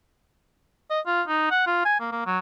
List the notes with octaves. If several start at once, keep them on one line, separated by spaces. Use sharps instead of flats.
D#5
F4
D#4
F#5
F4
G#5
A#3
A#3
F#3